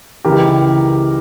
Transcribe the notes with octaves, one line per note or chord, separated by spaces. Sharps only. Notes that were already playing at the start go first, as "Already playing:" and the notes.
C#2 C#3 E3 G4 A#4